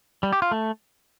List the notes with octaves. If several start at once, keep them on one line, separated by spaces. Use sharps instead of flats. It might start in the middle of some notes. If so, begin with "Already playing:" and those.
G3
G4
F4
A3